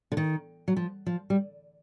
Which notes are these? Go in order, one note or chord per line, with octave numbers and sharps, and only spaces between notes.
D3
D#3
F#3
F3
F3
G3